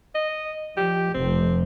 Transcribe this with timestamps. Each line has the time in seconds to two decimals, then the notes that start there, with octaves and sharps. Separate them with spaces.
0.15 D#5
0.77 F3 G4
1.14 F1 C4